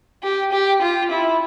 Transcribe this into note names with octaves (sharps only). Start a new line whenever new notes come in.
G4
G4
F4
E4